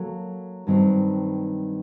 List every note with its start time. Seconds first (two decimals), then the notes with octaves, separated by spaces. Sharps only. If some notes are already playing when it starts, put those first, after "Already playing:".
Already playing: F#3 A#3 A4
0.67 G2 D#3 F#3 C4